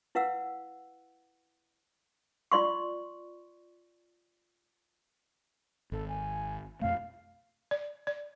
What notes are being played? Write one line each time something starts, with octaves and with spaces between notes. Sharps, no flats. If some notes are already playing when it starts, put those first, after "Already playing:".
E4 B4 F5 F#5 E6
F4 D5 C6 C#6
G#1 A4
G#5
F2 B2 A3 F5
D5
D5